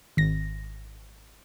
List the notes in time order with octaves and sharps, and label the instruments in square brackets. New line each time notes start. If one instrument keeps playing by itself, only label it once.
[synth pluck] G#1 A#6